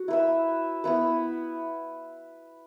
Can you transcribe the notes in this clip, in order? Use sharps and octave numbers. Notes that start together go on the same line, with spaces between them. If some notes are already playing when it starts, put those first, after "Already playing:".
Already playing: F#4
E4 B4 E5
B3 E4 B4